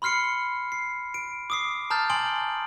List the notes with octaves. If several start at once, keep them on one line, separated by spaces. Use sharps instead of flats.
B5 C6 F6 C7 C#7
C7
D7
D6 D#6 C7
A5 A#5 D#6 F6 G6 A6
G#5 C6 D#6 D7 F#7